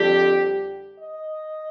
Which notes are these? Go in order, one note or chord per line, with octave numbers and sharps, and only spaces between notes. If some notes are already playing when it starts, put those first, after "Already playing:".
Already playing: F2 D3 G3 G4
D#5